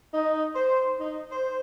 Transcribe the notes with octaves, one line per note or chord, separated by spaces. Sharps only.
D#4
C5
D#4
C5